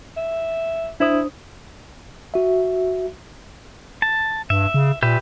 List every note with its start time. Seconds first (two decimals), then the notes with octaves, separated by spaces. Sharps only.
0.17 E5
1.00 D4 E4 C5 D#6
2.34 F#4 E5
4.02 A5
4.50 G2 E5
4.74 C#3
5.03 A#2 G4 B4 E5